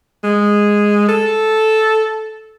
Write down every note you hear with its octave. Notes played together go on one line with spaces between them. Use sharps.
G#3
A4